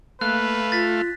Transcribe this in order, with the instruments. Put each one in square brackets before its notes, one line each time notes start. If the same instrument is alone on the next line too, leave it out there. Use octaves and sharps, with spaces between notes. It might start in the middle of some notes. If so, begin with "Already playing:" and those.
[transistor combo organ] A3 F5 [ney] A#3 [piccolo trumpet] B4 [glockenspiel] F#6
[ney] F4 [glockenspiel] A6 B6